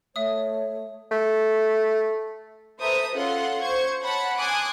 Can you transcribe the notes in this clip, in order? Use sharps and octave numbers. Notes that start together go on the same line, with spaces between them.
A3 C#5 E5 D#6
A3
A4 B4 C5 E5 A#5 D#6
C#4 F4 A4 F#5 C6
C5 C#6 G#6
C#5 F#5 A5 B5
G#5 A5 C6 D6 D#6 F#6